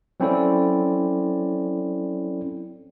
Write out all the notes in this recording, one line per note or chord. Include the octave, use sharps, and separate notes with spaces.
F#3 C4 C#4 E4 A4 D5